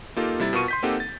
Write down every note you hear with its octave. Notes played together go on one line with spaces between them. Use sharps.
A#3 D#4 F4 G4 A4
C3 G3 E4 A6
B2 F4 A#4 C#6 D#7
C6 G6 B6
A#3 C4 D#4 G4 A4 F#5
A6